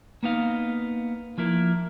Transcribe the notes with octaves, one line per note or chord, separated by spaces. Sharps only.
A#3 B3 D#4 F5
F3 A#3 E4 A#4